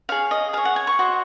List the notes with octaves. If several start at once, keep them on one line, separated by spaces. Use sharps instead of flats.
G#4 C#5 F5
D#5
G#4 C#5 F5
F#5
G#5
C#6
F#4 C5 D#5